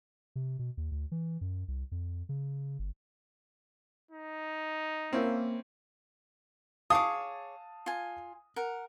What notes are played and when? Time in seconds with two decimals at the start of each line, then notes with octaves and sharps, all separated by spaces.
0.36 C3
0.59 B2
0.77 D#2
0.92 D2
1.12 E3
1.41 F#2
1.68 C2
1.92 F2
2.29 C#3
2.79 G1
4.11 D#4
5.13 A#3 C4 C#4 E4
6.90 G#4 C#5 F5 A5 D6 D#6
7.86 F4 G#5
8.56 A#4 F#5